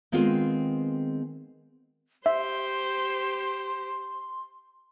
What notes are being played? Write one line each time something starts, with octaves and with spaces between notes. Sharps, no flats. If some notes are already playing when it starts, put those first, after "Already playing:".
D#3 G#3 B3 C4 F4
G4 C5 E5 C6